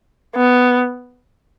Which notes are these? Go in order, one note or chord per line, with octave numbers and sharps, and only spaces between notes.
B3